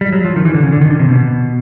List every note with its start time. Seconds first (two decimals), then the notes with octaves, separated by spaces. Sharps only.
0.01 G3
0.13 F#3
0.25 F3
0.36 D#3
0.45 E3
0.54 D3
0.63 C#3
0.72 D3
0.81 D#3
0.90 D3
1.00 C3
1.09 B2